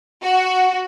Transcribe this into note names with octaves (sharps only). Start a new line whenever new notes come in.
F#4